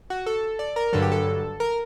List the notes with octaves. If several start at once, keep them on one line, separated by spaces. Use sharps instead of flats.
F#4
A4
D5
A#4
G2 D3 F#3 A4
G4
A4
A#4